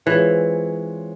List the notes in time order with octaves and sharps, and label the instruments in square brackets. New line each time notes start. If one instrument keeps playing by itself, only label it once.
[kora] E3 [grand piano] G#3 C4 F4 G#4 C#5